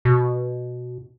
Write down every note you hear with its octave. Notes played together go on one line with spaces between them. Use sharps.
B2